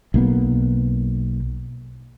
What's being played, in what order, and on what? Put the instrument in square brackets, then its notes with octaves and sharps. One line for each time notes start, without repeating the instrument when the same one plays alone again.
[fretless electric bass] B1 A#3 B3